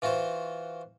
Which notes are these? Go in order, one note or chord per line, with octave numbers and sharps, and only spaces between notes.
E3 F4 F#4 C5